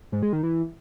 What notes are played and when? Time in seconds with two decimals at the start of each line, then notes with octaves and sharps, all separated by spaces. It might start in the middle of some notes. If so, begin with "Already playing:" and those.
0.12 G#2
0.23 G#3
0.33 D#3
0.43 E3